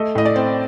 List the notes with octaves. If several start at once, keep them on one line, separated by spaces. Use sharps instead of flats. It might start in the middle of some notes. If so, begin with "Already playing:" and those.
Already playing: A3 D#5
A2 D#5
D5
C4